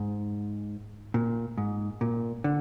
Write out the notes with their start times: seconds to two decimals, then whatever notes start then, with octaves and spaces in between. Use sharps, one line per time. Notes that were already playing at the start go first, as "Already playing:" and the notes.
Already playing: G#2
1.14 A#2
1.58 G#2
2.01 A#2
2.44 D3